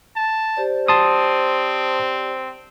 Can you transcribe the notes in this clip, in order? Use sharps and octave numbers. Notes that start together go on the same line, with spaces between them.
A5
G4 C5 D5
C4 A5 C6 D#6